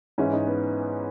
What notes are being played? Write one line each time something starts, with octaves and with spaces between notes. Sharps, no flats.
G#2 E3 C#4
D#4
B3